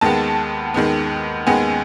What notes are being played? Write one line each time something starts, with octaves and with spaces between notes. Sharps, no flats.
D#2 D#3 G#3 B3 A5
D#2 D#3 G#3 B3
D#2 D#3 G#3 B3 G#5